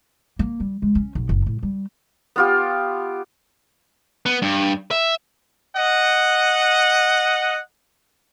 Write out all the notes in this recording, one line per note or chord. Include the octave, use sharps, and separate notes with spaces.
A#3
G3
G#3
C#4
B1
F#1
A2
G3
B3 F4 G4
B3
G2
E5
D#5 F#5